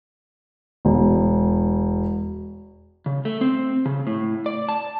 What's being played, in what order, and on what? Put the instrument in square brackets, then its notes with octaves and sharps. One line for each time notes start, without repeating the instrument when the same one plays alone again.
[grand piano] E1
[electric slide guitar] C#3
A3
C4
C#3
A2
D5
A5